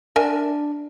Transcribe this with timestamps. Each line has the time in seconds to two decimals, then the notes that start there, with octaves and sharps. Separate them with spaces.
0.16 D4 A#4 E5 G#5